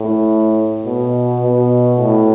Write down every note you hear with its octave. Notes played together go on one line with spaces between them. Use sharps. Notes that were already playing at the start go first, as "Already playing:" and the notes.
Already playing: A2
B2
B2
A2